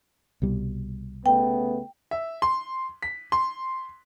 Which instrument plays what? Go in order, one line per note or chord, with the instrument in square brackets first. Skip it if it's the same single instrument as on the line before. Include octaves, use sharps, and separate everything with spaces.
[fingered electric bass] C2 B2 G3
[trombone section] C#3 A3 B3 [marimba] G5
[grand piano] E5
C6
B6
C6